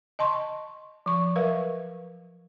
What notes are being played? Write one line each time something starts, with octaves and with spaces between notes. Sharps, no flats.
D#5 A5 C6 C#6
F3 C#6
F#3 A#4 B4 E5 F5